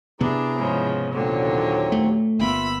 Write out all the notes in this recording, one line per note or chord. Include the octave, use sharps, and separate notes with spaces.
C3 B3 D4 E4 G#4 A#5
G#2 C#3 F3
D#2 A#2 D3 F#3 C4 C#5
A3
G1 A#3 B3 F4 E5 B5 E6